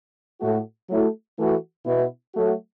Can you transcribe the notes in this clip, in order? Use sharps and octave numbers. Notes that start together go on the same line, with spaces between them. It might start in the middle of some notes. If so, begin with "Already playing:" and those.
A2 A3 F#4
F#3 A3 E4
E3 A3 F#4
B2 B3 E4
F#3 A3 F#4